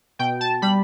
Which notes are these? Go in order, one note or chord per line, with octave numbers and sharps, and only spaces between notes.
B2 G5
A5
G3 B5